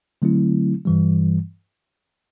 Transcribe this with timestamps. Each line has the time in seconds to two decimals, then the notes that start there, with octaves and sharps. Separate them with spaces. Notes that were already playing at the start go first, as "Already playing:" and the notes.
0.22 D3 F#3 A3 C4 E4
0.85 G2 E3 G3